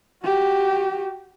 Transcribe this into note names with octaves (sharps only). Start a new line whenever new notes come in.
F#4 G4